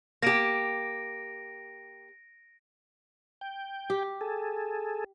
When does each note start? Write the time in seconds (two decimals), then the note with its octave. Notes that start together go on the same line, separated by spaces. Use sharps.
0.22 A#3 G4 A#6 D7
3.41 G5
3.90 G4
4.21 G#4 A4